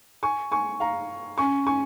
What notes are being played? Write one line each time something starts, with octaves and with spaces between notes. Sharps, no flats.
G#5 C#6
G#5 C#6
F5 A#5
C#4 G#5 C#6
G#5 C#6